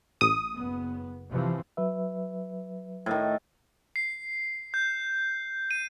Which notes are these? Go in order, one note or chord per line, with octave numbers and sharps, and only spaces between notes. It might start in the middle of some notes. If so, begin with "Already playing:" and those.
A1 D#6
F#1 B3
C3 E3 F3
F#3 B4 E5
A2 D#3
C7
G6
D#7